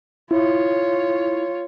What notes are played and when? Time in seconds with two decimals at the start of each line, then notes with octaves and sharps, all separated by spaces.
0.31 E4 F4 C#5